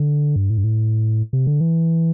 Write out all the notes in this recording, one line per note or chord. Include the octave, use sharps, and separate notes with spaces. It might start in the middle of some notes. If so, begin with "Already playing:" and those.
Already playing: D3
G2
A2
G2
A2
C3
D3
E3